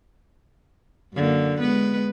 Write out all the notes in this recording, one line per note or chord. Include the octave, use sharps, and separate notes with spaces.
F#2 D3 A#3
G#3 B3 B4